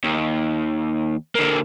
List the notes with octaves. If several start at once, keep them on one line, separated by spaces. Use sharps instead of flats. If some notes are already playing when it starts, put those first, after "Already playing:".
D#2
D3 A#3